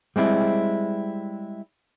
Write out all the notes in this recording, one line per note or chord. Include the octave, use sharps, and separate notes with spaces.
G3 G#3 C4 E4